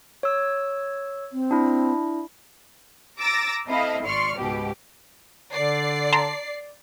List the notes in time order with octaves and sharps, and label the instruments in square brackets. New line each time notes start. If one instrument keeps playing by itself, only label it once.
[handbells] C#5 E6
[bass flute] C4
[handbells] D4 E4
[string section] A#5 D6 E6 A6 A#6
C4 E4 A4 D#5 F5
G#1 D5 C6 C#6 F6
C#2 G#2 B2 G4
[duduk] D3 [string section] D5 C7
[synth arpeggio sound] A5 A#5 C6